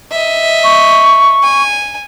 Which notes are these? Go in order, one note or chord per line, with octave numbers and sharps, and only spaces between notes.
D#5 E5
C#6
G#5